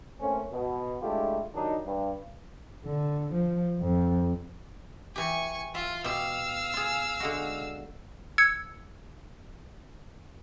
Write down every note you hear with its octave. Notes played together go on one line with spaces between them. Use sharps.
A3 A#3 C4 C#4
B2
G#3 A3 D4 E4 F4 G4
D#3 F#3 G3 D4 D#4
G2
D3
F3
F2
E3 G4 G#5 C#6
F4 E5
B2 G4 F5 E6
F4 G#4
D3 G#3 F#4
E6 G#6 C#7